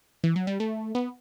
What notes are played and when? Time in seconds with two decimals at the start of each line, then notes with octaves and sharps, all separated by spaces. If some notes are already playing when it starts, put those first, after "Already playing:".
0.24 E3
0.36 F#3
0.47 G3
0.60 A3
0.95 B3